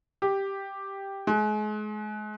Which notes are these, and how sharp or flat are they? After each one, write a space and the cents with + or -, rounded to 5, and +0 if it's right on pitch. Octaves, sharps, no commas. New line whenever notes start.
G4 +0
G#3 +35